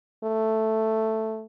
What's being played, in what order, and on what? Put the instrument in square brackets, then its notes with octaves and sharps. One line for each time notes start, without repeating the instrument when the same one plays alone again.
[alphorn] A3